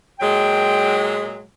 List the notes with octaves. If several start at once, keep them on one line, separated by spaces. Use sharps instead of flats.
A#2 F#3 G#3 G5